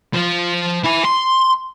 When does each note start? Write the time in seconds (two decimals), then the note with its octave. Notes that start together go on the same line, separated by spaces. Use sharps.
0.13 F3 C5
0.84 E4 G#5
1.05 C6